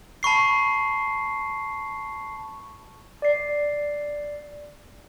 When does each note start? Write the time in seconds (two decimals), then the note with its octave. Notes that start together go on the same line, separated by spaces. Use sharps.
0.23 A5 B5 C#6 C7
3.22 D5 C7